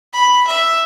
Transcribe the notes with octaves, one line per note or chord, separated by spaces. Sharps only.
B5
E5